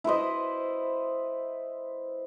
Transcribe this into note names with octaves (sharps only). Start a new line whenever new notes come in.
E4 B4 C5 D#5